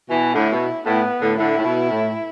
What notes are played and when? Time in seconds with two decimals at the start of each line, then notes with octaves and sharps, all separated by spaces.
0.09 B2 E3
0.34 A2 D3 E4
0.52 B2
0.86 A2 B3
1.21 A2 D3
1.38 A2 D3 E4
1.58 A2
1.64 B2
1.90 A2